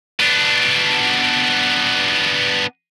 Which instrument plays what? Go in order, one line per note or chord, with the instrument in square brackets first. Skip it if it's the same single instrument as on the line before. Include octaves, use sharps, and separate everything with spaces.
[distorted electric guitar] B3 D4